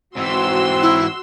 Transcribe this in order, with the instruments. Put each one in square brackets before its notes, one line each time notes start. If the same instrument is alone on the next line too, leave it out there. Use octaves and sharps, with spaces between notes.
[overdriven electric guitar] G#2 E3 [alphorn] C4 [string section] F#4 C6 E6
[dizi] E4